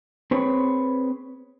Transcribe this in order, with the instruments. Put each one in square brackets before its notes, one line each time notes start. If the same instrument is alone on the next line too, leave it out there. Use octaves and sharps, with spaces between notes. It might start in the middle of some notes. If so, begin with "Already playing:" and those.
[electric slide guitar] C4 G#4 B4 C#5